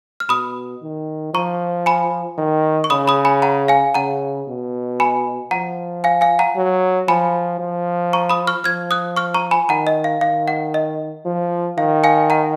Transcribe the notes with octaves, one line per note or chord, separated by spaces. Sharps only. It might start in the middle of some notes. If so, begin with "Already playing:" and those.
F6
B2 B5 D#6
D#3
F3 A#5 C#6
G#5 B5
D#3
C#6
C#3 B5 D#6
B5 D#6
G#5 B5
F#5 A#5
F5 G#5
C#3 F#5 A#5
B2
G#5 B5
F3 F#5 A#5
F5 G#5
F5 G#5
F#5 A#5
F#3
F3 G#5 B5
F3
A#5 C#6
B5 D#6
C#6 F6
F3 F6 G#6
D#6 F#6
C#6 F6
A#5 C#6
G#5 B5
D#3 F#5 A#5
D#5
F5
D#3 F5
F#5
D#5
F3
D#3 F5
F5 G#5
F#5 A#5